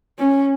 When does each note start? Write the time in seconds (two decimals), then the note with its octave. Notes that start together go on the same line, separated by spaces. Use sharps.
0.19 C#4